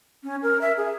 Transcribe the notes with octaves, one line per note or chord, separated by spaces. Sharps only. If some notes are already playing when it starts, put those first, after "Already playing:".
C#4
A#4
E5
G#4